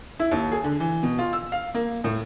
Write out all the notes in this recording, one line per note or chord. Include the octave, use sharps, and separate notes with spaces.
E4
D#2
G#4
D3
E3
B2
F4
E6
F5
A#3
A2